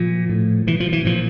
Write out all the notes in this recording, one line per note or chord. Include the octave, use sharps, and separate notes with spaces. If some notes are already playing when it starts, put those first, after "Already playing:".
Already playing: A#2 F3
A2
B2 E3
F3
E3
A#2 F3